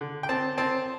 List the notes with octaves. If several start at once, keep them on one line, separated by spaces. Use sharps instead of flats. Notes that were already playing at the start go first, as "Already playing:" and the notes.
D3
G5
C4 A5
C4 A5